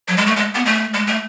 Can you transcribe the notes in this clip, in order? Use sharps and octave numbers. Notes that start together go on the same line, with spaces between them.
F#3
G#3
A3
G#3
B3
A3
G#3
A3